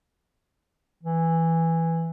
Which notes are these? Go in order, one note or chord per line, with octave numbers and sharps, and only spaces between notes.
E3